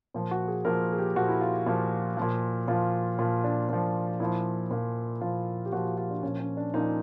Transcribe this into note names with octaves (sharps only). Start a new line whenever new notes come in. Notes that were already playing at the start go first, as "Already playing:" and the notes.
A#2 F3
F#4
G#4
A#2 F3 A#4
G#4
G4
A#2 F3 F#4
E4
F4
A#2 F3
A#2 F3
A#2 F3 F4
A#2 F3 F4
D4
A#2 F3
A#2 F3 E4
A#2 F3
A#2 F3 F4
G4
A#2 F3 F#4
F4
F4
D4
A#2 F3 C#4
C#4
D4
A#2 F3 D#4